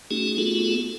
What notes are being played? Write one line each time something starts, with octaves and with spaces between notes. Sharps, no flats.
A3 C#4 D#4 F#4 G#4
A3 B3 F4 F#4 G#4 A4